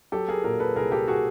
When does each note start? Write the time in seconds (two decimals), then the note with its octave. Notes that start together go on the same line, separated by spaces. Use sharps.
0.12 F#3 G4 A4
0.28 G#4 A#4
0.44 A#2 G#4 A#4
0.60 A4 B4
0.76 C2 G#4 A#4
0.92 G4 A4
1.08 F#4 G#4